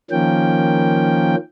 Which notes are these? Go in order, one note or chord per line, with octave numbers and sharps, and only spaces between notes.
D#3 F3 A#3 C#4 G5